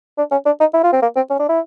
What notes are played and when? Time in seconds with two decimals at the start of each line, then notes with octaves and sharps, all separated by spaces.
0.18 D4
0.32 C#4
0.46 D4
0.60 D#4
0.74 E4
0.84 F4
0.92 C4
1.02 A#3
1.16 C4
1.30 C#4
1.39 D4
1.49 E4